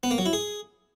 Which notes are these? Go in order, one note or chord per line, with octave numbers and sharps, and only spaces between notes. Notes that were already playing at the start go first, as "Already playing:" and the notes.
B3
A#3
F#3
E4
G#4